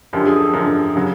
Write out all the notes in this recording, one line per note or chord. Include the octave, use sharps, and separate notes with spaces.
F#2 D3 F3 G4
G#4
A4
F#2 D3 F3 A#4
C#3 F#3